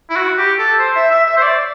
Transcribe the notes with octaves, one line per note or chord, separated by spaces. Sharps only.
E4
F#4
G4
A4
C5
E5
E5
E5
C5
D5